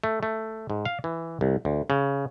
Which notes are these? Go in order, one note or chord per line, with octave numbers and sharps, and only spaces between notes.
A3
A3
G#2
F5
E3
C2
D2
C#3